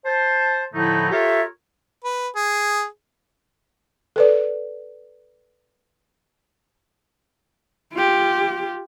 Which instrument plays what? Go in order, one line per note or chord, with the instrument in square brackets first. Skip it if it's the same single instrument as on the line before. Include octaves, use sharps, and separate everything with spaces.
[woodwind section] C5 A5
A2 D3 F3 A3 D#4 E4
F4 G4 A4 A#4 C#5 E5
[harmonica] B4
G#4
[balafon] A4 B4 D5
[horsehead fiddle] F4 G4